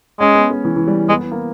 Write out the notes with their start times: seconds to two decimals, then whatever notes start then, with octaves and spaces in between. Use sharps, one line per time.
0.20 G#3 C#4
0.35 B3
0.50 G#3
0.65 E3
0.76 E3
0.87 G3
1.09 G#3 B3
1.20 B3
1.32 A#3